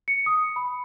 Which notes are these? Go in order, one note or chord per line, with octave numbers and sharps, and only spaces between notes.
C#7
D#6
B5